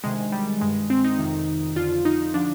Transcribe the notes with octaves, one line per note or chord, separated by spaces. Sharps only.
D2 C3 D#3 G#3
G3
G2 D#3 G#3
C4
D#4
F2 C3 D#3
F2 D3 F3 F4
D#4
D3 F3 D4